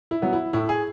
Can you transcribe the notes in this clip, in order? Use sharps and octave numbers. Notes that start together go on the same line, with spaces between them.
E4
F#3 B3
E4
A2 E4
G#4